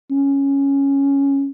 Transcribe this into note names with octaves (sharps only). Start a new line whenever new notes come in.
C#4